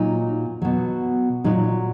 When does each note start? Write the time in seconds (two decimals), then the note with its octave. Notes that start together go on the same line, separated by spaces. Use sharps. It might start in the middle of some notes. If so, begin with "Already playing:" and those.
Already playing: A#2 F#3 D#4
0.62 B2 F#3
1.44 A#2 F#3 D#4